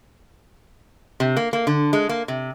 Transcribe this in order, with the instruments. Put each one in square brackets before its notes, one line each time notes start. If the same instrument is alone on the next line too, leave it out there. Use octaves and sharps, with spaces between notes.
[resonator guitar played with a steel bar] C3
A#3
A#3
D3
G#3
A#3
C3